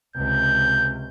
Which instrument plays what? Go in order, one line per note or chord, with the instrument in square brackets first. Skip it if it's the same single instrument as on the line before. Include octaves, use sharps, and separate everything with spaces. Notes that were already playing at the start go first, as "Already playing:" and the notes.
[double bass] C#2 C3 [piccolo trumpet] G6